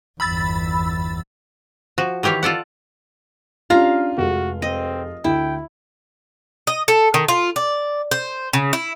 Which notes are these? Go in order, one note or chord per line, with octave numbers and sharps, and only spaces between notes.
G1 E2 B5 E6 A6
F3 F#4
D#3 E3 G4 C#5 F5
F4 A4 D5 F#5
C#4 D4 F4 G4 F5 A#5
F1 G#3 F#4
C4 D#5
D2 E4 G5
D#5
A4
D#3
F4
D5
C5
C#3
E4